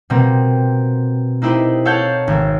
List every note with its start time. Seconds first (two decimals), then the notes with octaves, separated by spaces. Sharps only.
0.10 B2 G3 A#3 C4
1.42 A#3 D#4 E4 G4 C5
1.85 A4 C#5 F5 F#5 A5 G6
2.28 G#1